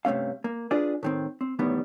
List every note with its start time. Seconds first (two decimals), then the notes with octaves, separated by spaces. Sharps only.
0.05 G2 C3 A3 C#4 F5
0.44 A#3
0.71 D4 F4 G#4 B4 D5
1.03 A2 D#3 C4
1.41 C4
1.59 B1 E2 A2 D#3 G3 B3